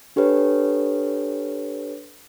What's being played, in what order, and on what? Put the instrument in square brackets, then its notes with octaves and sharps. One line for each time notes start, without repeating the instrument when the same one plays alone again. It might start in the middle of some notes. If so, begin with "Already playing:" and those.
[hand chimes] D4 G4 A4 B4 C#5